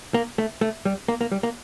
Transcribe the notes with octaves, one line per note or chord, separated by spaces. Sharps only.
A#3
A3
A3
G3
A#3
A#3
G3
A#3